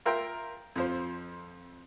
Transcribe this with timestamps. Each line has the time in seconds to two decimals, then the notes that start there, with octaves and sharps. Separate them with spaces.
0.05 F4 A#4 E5 G5 C6
0.76 F2 F3 C5